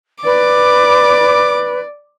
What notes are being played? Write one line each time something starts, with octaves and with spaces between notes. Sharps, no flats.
B4 D5 D6